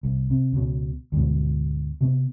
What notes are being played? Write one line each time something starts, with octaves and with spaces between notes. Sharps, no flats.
C2
C3
C#2 B2
D2 G#2 B2
C3 B3